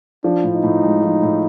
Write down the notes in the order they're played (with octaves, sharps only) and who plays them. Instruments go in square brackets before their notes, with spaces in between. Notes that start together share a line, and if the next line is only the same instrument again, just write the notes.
[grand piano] F3 [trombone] D4
[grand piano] A2
[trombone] D#4
[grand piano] A2
G#3
F3
A2